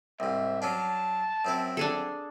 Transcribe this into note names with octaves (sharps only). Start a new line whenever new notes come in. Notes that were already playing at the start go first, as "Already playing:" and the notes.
C2 G#2 E5
F#3 C#4 D4 A5
F#2 C4 E4
D4 G#4 A4